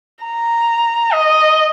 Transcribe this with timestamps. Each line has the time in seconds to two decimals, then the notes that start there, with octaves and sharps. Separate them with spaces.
0.25 A#5
1.13 D#5